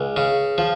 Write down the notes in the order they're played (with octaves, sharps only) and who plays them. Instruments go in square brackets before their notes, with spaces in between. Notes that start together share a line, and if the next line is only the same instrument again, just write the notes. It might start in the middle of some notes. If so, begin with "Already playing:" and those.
Already playing: [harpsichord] C#2
C#3
F3